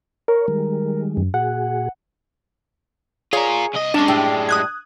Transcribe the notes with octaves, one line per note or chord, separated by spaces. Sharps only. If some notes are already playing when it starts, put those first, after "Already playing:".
A#4 C#5
D#3 G3 G#3
F#2
A#2 F#4 G#4 F#5
F4 G#4 A#4 C#5 G#5
C2 D#5
F#2 G#3 C#4 D4 A5
A2 G3 G4
D#6 F#6 G#6